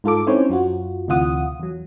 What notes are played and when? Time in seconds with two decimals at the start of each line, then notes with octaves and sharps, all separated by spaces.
0.04 G#2 F4 A4 D6
0.27 C4 C#4 D#4 E4 C5 C#5
0.50 F#2 F4 F#4
1.08 D2 C3 E3 F4 F#5 D#6
1.60 E2 F#3